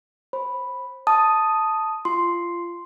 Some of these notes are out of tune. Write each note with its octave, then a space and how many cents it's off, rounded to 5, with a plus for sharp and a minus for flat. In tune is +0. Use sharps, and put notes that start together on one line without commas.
C5 +30 B5 +0
A5 +0 D#6 +0
F4 -20 C6 +0